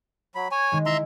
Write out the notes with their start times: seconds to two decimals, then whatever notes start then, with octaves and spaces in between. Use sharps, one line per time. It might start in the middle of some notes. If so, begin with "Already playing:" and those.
0.35 F#3 B5
0.51 C#5 G#5
0.72 D#3 G#3
0.86 E4 E5 A#5 C6